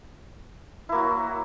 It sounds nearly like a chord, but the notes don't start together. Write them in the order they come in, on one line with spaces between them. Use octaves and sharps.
E4 A#3 F#4 F#3